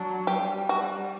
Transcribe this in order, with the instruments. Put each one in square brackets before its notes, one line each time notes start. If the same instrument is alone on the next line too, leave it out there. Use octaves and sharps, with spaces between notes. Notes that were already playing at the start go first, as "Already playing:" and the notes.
Already playing: [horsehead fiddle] F#3 [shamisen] D4
[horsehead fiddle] G3 [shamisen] G4
[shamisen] F#4